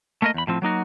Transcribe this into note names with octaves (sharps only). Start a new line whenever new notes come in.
A3 A#3 A#4 B4 D#5
E2 B5
A2 F3 C4
F#3 A#3 D#4 F#4